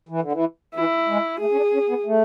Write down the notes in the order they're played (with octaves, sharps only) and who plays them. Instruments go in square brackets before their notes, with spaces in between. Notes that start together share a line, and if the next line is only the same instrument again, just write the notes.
[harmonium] E3
D3
E3
[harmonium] E3 [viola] E4
[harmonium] G#3
[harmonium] A3 [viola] G#4
[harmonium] C#4
D4
C#4
B3
A3